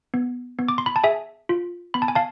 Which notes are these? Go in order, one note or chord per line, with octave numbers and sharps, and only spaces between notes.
B3
B3
D6
C6
B5
A5
G#4 E5 G#5
F4
B3 B5
A5
G#5
F5 A5